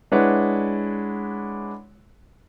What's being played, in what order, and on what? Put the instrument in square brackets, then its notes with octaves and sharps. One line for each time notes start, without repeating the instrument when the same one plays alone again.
[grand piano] G#3 D4 E4 B4 C#5 F#5